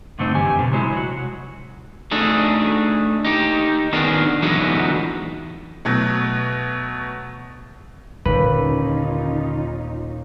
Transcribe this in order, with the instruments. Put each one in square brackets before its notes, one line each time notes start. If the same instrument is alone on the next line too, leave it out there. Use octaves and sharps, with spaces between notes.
[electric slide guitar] G2 D3 A3 C4 D#4
F2 C3 E3 G4 G#5
B2 D3
C3 F#3 G#3 E4
F#3 F#4
[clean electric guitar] A3 D4 D#4 G#4
D#4 G4
D#3 B3 D4 G#4 A#4
D3 E3 F#3 G#3 B3 D#4
[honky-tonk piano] B2 F#3 A3
[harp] D#2 A#2 [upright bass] D3 [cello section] C#4 D#4 F4 [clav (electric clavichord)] B4